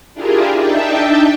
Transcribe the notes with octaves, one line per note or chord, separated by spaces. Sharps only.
D4 E4 F4 G4 G#4 A#4
D4 D#4 E5 G5 A5